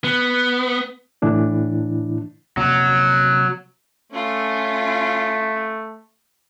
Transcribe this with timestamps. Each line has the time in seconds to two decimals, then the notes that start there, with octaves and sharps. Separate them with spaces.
0.04 B3
1.22 A2 E3 D4 E4
2.57 C3 F#3 A#3 C#4
4.12 A3 C#4 F4